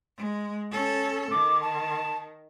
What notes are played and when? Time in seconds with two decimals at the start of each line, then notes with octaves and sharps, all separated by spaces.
0.17 G#3
0.72 C#4 A4
1.31 D#3 D6
1.61 A5